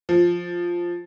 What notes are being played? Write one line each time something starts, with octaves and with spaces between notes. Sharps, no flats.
F3